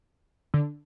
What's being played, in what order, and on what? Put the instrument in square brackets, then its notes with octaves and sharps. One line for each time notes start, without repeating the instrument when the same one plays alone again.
[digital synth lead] D3